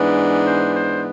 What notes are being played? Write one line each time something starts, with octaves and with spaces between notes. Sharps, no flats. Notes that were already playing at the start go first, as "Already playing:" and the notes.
Already playing: G#2 E3 B3 D4
C5
C5